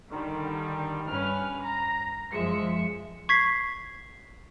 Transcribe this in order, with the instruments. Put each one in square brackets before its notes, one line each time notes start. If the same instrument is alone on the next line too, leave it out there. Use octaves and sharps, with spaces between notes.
[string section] D3 D#3 G3
G2 C#4 B4 F6
A#5
F#2 F3 G#3 E5 C#7
[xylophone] C#6 G#6 B6 C7